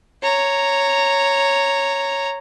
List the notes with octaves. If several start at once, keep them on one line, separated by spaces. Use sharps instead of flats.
C#5 A#5